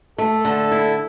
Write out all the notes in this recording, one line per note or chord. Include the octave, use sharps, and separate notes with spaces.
A3 A4
D3
E4